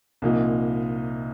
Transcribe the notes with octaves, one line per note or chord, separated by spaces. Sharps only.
C2 A#2 F3 A#3 D#4